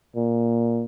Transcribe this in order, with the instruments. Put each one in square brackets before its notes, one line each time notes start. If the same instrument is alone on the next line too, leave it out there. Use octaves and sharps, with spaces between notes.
[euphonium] A#2